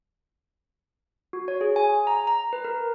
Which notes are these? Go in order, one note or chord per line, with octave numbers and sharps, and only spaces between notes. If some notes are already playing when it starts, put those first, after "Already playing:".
F#4
C#5
G#4
G#5
A#5
A#5
B4
A#4